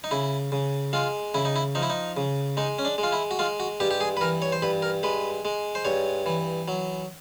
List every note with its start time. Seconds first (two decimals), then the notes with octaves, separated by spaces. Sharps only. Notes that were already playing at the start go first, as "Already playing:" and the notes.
0.04 D#4
0.11 C#3 E4
0.52 C#3
0.93 G#3 F4
1.34 C#3 E4
1.45 D#4
1.56 E4
1.75 F3 D#4
1.83 E4
1.90 D#4
2.17 C#3
2.57 G#3 D#4
2.79 C#4
2.85 D4
2.98 G#3
3.03 F4
3.12 E4
3.31 F#4
3.39 G#3 F4
3.60 F#4
3.80 G2 G4
3.91 G4
4.01 G#4
4.17 B4
4.21 E3 A#4
4.42 C#5
4.52 C5
4.62 G2 B4
4.82 A#4
5.03 G#3 B4
5.45 G#3
5.75 C5
5.85 G2 C#5
6.26 E3
6.68 F#3